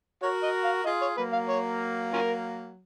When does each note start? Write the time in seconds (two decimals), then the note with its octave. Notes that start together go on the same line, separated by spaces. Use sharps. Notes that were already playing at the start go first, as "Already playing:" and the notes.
0.22 F#4 A#4 C#5
0.43 D#5
0.64 F5
0.85 F4 G#4 D#5
1.01 C#5
1.17 F#3 A#3 B4
1.33 F5
1.49 C#5
2.13 C#4 F4 A#4